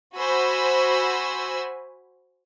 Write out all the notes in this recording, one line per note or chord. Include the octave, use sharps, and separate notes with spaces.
F#4 C5 G#5 B5 E6